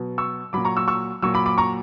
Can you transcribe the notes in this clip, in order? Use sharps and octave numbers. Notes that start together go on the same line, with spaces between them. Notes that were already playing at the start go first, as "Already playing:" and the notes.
Already playing: B2 F#3
C#6 E6
A#2 F#3 B5 D6
A#5 C#6
C#6 E6
C#6 E6
A#2 F#3 C#6 E6
B5 D6
B5 D6
A#5 C#6